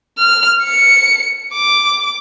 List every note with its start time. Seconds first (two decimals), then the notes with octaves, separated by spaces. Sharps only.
0.18 F6
0.63 C#7
1.54 D6